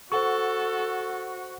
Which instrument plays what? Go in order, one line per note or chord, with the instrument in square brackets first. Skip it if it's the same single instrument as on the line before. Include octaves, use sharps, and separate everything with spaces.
[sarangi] F#4 [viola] A4 [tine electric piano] C5 F#5 C#6